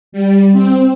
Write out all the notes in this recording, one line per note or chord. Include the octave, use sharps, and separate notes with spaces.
G3
C4